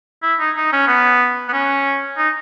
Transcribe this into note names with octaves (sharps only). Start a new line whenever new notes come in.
E4
D#4
D#4
C#4
B3
B3
C#4
D#4